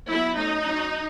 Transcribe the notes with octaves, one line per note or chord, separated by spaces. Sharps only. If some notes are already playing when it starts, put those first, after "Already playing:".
F#3 B3 E4
F#3 A3 C#4 D#4
F#3 C#4